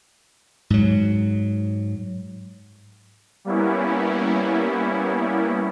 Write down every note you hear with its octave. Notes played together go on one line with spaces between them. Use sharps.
G#2 F#3
G3 A#3 B3 C#4 E4